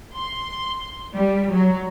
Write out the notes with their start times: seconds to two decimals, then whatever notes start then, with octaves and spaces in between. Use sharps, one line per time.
0.16 C6
1.15 G3
1.52 F#3